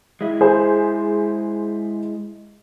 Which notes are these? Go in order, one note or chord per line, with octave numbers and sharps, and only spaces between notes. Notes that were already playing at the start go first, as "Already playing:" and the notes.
G#3 E4
G#4 C5